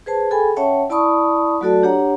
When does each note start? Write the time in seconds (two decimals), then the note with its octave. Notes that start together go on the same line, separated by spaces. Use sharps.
0.06 G#4 B4 C5 A5
0.31 G#4 A4 G5 G#5 B5
0.57 C#4 C#5 E5 F#5 G5 A5
0.90 E4 D5 A5 B5 C#6 D#6
1.61 F#3 A3 F#4 A4 D5 A5
1.83 D4 G4 C#5 F#5 A#5